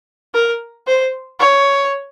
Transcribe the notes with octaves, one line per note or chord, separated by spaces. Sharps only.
A#4
C5
C#5